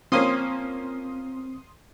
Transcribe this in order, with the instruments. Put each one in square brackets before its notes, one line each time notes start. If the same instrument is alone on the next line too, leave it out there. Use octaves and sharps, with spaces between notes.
[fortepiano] F3 A#3 C#4 [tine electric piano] C4 [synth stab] C6 D#6